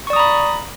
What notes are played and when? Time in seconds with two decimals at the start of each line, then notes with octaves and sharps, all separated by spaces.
0.07 C#6
0.10 D5
0.13 D#6
0.16 A#5
0.19 B5